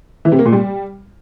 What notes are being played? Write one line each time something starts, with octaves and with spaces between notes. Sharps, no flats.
E3
C3
A#3
A#2
G3